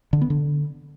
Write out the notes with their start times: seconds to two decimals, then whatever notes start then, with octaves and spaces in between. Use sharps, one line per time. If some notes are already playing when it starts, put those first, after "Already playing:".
0.13 D3
0.21 B3
0.30 D3